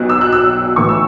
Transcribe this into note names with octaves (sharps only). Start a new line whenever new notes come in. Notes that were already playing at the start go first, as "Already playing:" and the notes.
Already playing: B1 B2 F#3 F#6
E6
F#6
E6
B1 A2 E3 C#6
E6